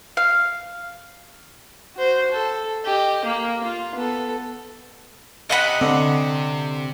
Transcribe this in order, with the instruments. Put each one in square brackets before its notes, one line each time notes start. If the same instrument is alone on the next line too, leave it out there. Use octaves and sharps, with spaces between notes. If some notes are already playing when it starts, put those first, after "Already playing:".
[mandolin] F5
[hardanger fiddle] F#4 C5
A4
G4 D#5
A#3
F4
B3 A4
[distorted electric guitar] C3 [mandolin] D#5 F#5 B5
[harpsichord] D3 [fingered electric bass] C4